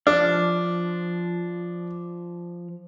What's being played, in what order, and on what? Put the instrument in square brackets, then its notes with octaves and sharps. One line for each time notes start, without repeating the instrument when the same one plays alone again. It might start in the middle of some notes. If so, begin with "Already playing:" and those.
[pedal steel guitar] F3 F6 [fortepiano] D4